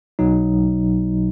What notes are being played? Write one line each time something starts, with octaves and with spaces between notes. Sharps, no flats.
B1 B2 F#3 D#4